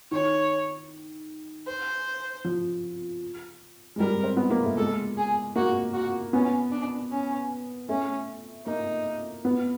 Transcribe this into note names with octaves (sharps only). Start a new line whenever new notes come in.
D#3 C#5
C5
F3
G#3
G3 A#4
C4
B3
A#3
A3
G#3 A4
G#4
A#3 F#4
F#4
B3 C#4
D4
C#4
A3 C#4
A#3 D#4
B3